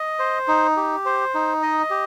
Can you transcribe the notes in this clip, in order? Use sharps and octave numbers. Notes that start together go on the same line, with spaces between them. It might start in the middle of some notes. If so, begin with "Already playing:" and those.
Already playing: D#5
C5
D#4
G4
C5
D#4
D#5
G4